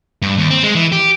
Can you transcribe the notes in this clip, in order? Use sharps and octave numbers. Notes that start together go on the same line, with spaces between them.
G2
D#2
C4
G#3
E3
G4